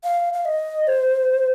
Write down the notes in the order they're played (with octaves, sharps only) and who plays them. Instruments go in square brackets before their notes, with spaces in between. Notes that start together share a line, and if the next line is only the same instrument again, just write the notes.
[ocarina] F5
F5
D#5
C5